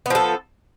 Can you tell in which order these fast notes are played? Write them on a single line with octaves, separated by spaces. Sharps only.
B3 F3 A4